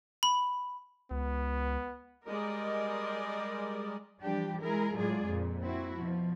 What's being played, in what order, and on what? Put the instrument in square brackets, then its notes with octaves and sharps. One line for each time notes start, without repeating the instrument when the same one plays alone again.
[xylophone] B5
[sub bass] C#2 [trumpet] B3
[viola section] G3 G#3 A#4 D5 D#5
[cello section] E3 F3 G3 D4 G4
G#3 E4 G#4 A#4
A2 F#3 G#3 F4 G#4 D5
F2 A#2
C4 E4 F#4
B2 F3